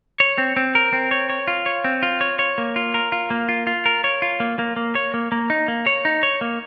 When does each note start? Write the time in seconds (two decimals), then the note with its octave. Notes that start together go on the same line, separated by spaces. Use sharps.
0.20 C#5
0.38 C4
0.56 C4
0.75 A#4
0.93 C4
1.11 C#5
1.30 C#5
1.48 F4
1.66 C#5
1.84 C4
2.03 F4
2.21 C#5
2.39 C#5
2.58 A#3
2.76 F4
2.94 A#4
3.12 F4
3.30 A#3
3.49 F4
3.67 F4
3.86 A#4
4.04 C#5
4.22 F4
4.40 A#3
4.59 A#3
4.76 A#3
4.95 C#5
5.14 A#3
5.32 A#3
5.50 D#4
5.68 A#3
5.87 C#5
6.05 D#4
6.23 C#5
6.41 A#3